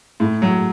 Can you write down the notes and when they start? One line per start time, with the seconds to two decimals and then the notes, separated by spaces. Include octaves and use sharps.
0.20 A2
0.42 F#3